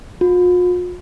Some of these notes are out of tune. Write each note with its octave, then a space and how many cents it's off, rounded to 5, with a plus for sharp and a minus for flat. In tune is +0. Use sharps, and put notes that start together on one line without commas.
F4 +45